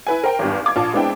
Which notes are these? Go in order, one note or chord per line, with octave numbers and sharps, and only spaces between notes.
E4 B4 G#5
A#4 C5 G5
G#1 E2 G2
F5 D6 G#6
A#1 F4 A5
G#3 B3 C4 D4 E4 G5